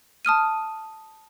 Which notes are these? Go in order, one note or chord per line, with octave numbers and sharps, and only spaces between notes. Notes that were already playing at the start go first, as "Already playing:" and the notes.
A5 D#6 F6 D#7